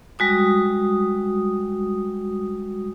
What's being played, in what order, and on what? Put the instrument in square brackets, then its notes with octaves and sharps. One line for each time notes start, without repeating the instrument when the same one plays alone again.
[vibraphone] G3 G#3 F#4 D#6